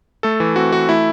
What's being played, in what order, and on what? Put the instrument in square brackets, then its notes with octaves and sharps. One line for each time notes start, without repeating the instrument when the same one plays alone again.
[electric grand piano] A3 A4
E3
C4 F#4
E3 F#4
A3 E4